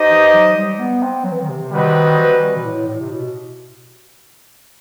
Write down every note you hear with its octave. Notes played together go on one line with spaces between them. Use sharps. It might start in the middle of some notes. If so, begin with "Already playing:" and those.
Already playing: D#4 G4 C5 D#5
E3
F#3
G3
B3
C4
F#3
E3
D#3
C3
D#3 G3 C4 F#4 B4 D#5
E3
B2
A2
A2
C3
B2